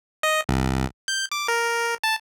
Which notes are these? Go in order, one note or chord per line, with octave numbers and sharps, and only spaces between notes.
D#5
C2
G6
D6
A#4
A5